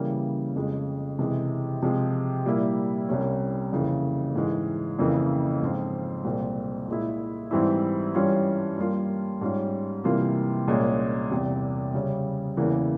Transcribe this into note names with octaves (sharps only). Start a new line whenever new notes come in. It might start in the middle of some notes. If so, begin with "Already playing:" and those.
Already playing: C#3 E3 G3 A#3
F2 C#3 F3 G#3
C3 E3 G#3
C3 F3 G#3
A#2 G3 A#3 E4
C2 C3 G3 C#4
F2 C#3 E3 A#3
G#2 E3 G#3
F2 C#3 E3 A#3
G#2 F3 C4 F4
C2 A#2 G#3 C4
A#2 G#3 E4
G#2 E3 G3 C4 E4
G2 E3 G3 C#4 F4
G2 G3 A#3 F4
G#2 G3 C#4 F4
C3 E3 G3 A#3 F4
C2 A#2 G#3 C#4
E2 C3 G3
C#3 G3 C#4
E2 C#3 E3 A#3